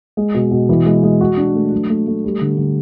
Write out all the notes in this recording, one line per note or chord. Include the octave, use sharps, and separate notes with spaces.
G#3
B2
B2
E3
G#3
G#3
F#4
D4
A3
F#3
A3
A3
G3
D3
D3